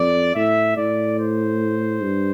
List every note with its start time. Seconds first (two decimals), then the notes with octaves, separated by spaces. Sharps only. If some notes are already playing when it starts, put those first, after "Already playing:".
Already playing: F2 D5
0.35 A2 E5
0.77 A2 D5
1.18 C5
2.02 G2